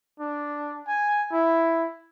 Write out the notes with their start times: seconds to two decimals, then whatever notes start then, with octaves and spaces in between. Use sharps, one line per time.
0.20 D4
0.88 G#5
1.32 E4